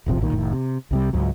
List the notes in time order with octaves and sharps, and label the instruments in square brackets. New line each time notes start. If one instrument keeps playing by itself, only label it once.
[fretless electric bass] D#1 G#1 C3 F3
B1 A#2 D#3
F1 A2 D#3
C3
C2 C3 G3
C#2 G#2 F#3